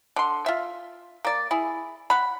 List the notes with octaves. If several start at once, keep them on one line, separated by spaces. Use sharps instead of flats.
D3 C6
F4 E5
A#3 D5
E4 G#4
F#5 B5